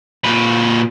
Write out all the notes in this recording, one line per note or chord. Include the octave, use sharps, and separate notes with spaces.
A#2 B4